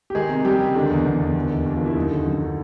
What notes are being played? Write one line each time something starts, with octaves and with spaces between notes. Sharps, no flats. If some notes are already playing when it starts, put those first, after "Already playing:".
G4
D#3 G#3 G#4
C3
C3 G3 G4
C#2
D3 D#3 D4
E2
E2
E2
D#2
D#3
D#2
F4
D#2 E4
F#2 D#3 D#4
D3
F#2
D3